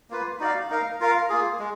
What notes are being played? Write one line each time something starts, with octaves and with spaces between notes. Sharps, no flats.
A#3 F4 B4
D#4 F#4 D5 F5
D#4 A#4 F5
F4 A#4 F5
A#3 F4 G#4
G#3